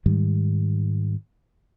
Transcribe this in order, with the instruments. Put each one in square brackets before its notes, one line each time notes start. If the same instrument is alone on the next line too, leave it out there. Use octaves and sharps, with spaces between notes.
[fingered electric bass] G#2 D#3 G3